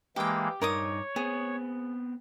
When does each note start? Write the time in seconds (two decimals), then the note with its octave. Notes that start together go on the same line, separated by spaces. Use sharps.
0.16 E3 G#3 A#3 G4 G5
0.61 G2 D#4 A#4 C#5 D6 D#6
1.16 B3 C4 G#4